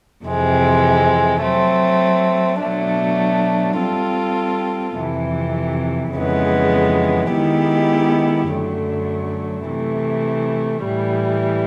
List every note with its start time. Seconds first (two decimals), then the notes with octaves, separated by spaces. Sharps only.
0.25 F2 C3 E3 G#3 C4
1.42 F#3 A3 C4
2.60 B2 F#3 A3 D4
3.78 G3 C4 F4 A4
4.95 F2 C3 E3
6.13 F2 C#3 E3 G#3 B3
7.30 D#3 G#3 B3 E4 G4
8.48 F#2 D3 F#3 A3
9.66 C3 E3 A3
10.83 A2 E3 G3